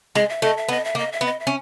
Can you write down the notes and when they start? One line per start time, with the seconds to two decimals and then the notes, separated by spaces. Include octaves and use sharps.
0.15 G#3 D#5
0.29 E5
0.42 A3 D#5
0.57 E5
0.68 B3 D#5
0.85 E5
0.95 A#3
0.98 D#5
1.12 E5
1.21 B3
1.26 D#5
1.40 E5
1.47 C#4